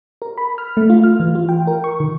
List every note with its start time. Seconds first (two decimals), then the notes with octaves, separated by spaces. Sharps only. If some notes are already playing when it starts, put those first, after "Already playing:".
0.22 A#4
0.37 B5
0.58 F6
0.77 A3
0.90 F4
1.04 F6
1.20 E3
1.35 F4
1.49 G5
1.67 A#4
1.84 C#6
2.00 D#3